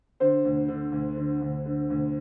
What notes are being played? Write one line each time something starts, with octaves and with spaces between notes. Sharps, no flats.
D3 C5
D2
D3
D2
D3
D2
D3
D2